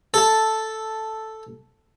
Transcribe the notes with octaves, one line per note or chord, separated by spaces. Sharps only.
A4 A5